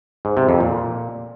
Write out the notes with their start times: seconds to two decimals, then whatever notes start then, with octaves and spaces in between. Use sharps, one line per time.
0.25 G#2
0.37 C3
0.49 F2
0.60 A#2